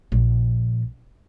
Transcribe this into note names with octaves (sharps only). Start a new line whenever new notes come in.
A#1